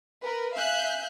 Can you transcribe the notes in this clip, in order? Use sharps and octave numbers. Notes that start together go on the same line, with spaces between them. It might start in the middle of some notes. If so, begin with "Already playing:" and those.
A#4 B4
E5 F5 G#5 F#6 G6